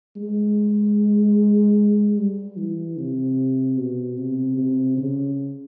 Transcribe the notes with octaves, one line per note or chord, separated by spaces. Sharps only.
G#3
G3
E3
C3
B2
C3
C3
C#3